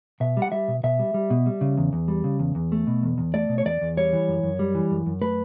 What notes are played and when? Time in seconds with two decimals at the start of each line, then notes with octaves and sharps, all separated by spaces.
0.20 B2 E5
0.37 G3
0.42 F#5
0.52 G3 E5
0.68 B2
0.83 B2 E5
0.99 G3
1.14 G3
1.30 B2
1.46 G3
1.61 C#3
1.78 E2
1.93 E2
2.08 G3
2.24 C#3
2.39 E2
2.55 E2
2.72 A3
2.87 B2
3.03 E2
3.18 E2
3.34 A3 D5
3.49 B2
3.58 C#5
3.65 E2 D5
3.81 E2
3.97 G3 C#5
4.13 E3
4.28 F#2
4.43 F#2
4.59 G3
4.75 E3
4.91 F#2
5.06 F#2
5.21 A3 B4